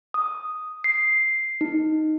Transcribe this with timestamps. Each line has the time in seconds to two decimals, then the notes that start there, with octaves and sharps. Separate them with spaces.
0.14 D#6
0.84 C7
1.61 D#4